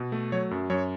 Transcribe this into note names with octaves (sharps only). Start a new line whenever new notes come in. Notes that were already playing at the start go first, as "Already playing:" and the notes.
Already playing: B2
A3
F#3 C#5
F#2
F#2 C#5